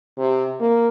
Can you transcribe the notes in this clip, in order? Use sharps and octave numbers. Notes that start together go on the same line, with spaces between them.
C3
A#3